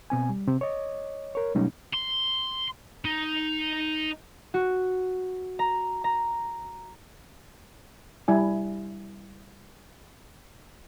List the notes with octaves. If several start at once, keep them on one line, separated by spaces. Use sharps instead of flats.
B2 C4 G#5
G3
C3 C4
C#5 D#5
A#4 C#5
B2 F#3 G3 A3 C#4 D#4
C6
D#4
F#4
A#5
A#5
G3 E4 G#5